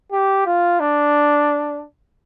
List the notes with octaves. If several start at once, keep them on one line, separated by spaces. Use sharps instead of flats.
G4
F4
D4